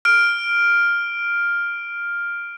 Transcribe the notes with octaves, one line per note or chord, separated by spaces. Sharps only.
F6 D7